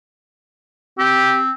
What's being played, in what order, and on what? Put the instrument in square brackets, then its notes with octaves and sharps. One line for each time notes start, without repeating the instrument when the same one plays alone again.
[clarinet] C4 [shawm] G4